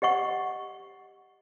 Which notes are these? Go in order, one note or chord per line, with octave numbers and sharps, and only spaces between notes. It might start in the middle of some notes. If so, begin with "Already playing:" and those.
G4 D#5 F#5 C#6